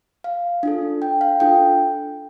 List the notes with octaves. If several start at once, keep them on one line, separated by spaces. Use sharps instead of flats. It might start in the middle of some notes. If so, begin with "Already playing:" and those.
F5
D4 F4 A4
G5
F5
D4 F4 A4 G5